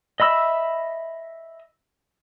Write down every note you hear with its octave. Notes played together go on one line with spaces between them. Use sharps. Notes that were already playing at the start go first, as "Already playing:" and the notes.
D#5 E5 B5 E6